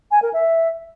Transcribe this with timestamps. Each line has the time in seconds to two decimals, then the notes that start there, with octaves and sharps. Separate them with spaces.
0.11 G#5
0.22 A#4
0.33 E5